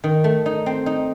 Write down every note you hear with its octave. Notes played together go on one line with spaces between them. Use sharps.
D#3
A3
D#4
C4
D#4